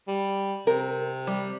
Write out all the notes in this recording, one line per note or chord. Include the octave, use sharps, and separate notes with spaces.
G3
C3 A#4
G3